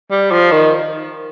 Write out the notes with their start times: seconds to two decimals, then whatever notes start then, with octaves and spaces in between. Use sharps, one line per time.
0.11 G3
0.32 F3
0.52 D#3